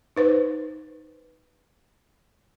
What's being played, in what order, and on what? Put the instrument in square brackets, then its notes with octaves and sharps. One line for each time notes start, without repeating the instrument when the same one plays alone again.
[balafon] D#4 B4 C5